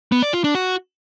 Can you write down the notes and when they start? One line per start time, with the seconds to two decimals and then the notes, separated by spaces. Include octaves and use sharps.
0.12 B3
0.23 D5
0.33 F4
0.44 D4
0.55 F#4